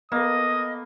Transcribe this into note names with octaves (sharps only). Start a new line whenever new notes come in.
A#3 B3 A4 D#5 D#6